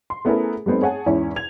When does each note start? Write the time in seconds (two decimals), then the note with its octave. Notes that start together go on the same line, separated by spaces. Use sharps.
0.10 C6
0.25 A3 B3 C#4 E4 G#4 A#4
0.66 G3 A3 B3 C4 D#4
0.82 G#4 C#5 F#5 G#5 A5
1.06 E2 G#2 C#4 E4
1.36 G#6 F7